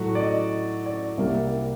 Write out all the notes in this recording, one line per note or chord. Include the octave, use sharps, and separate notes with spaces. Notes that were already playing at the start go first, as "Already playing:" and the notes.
Already playing: A2 F#3 A3 F#4
D5
D#5
D5
C2 C3 G3 A#3